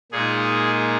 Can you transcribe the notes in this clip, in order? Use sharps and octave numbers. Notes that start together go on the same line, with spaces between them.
A#2 G#3 D#4 G#4